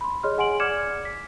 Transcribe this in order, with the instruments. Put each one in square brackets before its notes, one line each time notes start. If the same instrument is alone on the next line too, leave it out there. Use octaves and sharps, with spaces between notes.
[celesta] B5 C6
G#4 C#5 D#5 C6 F6
G#4 F#5 G#5 C6 D7 F#7
D5 D6 F6 G#6 C#7 E7
B6